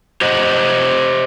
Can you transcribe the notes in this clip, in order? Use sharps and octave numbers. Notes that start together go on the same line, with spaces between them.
G4 C5 D#5 F#5